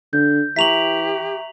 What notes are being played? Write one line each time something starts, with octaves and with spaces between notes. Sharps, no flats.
D3 G6
E3 G4 E5 A#5 C#6 B6 F7 F#7